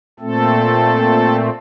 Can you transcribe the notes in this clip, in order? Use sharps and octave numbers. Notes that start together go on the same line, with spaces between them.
A#2 A3 C4 A4